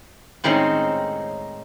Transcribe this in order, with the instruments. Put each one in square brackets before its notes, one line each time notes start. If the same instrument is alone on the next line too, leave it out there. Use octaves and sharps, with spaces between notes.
[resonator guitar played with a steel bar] A2 D#3 G#3 C4 C#4 D#4